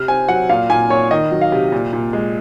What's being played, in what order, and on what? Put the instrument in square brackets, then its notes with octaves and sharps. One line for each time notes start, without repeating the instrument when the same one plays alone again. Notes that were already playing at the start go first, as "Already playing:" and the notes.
Already playing: [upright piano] C3 F6
C4 G#5
F#3 F#5
A#2 F5
A#2 G#5
A#2 C#5
D#3 D#5
F#3
F5
C3
A#2
A#2
G#3